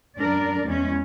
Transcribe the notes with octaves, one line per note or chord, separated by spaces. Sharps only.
F#2 D4 A#4 D5
E2 G#3 C#4